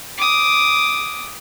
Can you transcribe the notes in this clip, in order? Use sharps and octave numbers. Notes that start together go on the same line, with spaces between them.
D6 D#6